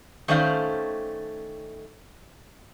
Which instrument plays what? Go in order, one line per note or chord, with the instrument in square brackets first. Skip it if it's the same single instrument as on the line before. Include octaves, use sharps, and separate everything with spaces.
[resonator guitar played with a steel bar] D#3 A3 C#4 C5 D5 F5